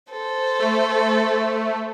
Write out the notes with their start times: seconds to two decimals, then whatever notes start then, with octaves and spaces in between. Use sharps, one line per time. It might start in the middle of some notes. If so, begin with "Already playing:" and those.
0.11 A4 C5
0.59 A3